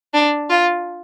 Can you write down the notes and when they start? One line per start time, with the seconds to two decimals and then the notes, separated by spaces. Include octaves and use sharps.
0.14 D4
0.50 F4